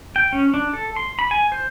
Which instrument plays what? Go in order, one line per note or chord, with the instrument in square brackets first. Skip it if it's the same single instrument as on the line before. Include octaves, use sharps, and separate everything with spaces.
[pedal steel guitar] G5
C#4
D4
A4
C6
B5
G#5
C5